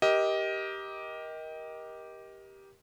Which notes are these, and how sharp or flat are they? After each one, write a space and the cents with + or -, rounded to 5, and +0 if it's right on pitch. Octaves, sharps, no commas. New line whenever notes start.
G4 +0 A#4 +20 D#5 +20